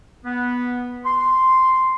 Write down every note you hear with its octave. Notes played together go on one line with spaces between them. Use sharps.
B3
C6